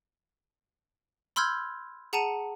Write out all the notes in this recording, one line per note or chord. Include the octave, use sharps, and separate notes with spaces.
B5 C6 E6 F6 G6 G#6
G#4 F#5 A5 A#5 C#7 D#7